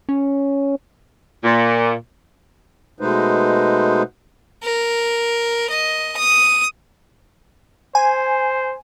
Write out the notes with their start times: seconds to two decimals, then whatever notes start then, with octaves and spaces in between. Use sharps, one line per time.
0.09 C#4
1.44 A#2
3.00 B2 G#3 A3 D#4 B4 C5
4.63 A#4
5.70 D#5
6.17 D#6
7.95 C5 G#5